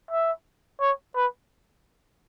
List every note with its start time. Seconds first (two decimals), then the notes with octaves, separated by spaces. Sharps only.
0.11 E5
0.81 C#5
1.16 B4